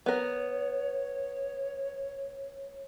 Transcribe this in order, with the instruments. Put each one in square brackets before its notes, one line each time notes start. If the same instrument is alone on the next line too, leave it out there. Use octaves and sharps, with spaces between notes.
[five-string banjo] B3 A#4 [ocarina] C#5